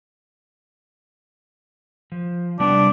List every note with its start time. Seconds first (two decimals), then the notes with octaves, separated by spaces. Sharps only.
2.12 F3
2.60 C3 G3 B3 D4